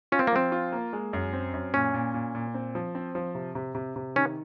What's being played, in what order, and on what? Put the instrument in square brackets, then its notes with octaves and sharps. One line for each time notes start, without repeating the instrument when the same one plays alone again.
[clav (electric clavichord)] C#4 [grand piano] F4
[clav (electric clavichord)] C4
A#3
[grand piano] F3 [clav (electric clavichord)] C4
[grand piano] F4
A#3
G#3
F#2
C4
F#2
[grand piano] A#2 [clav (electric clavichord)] C#4
[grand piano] A#2
A#2
A#2
C4
F3
C4
F3
C3
C3
C3
C3
[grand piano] D#3 [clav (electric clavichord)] C#4